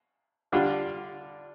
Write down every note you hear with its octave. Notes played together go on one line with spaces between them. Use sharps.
D3 G3 D4 F4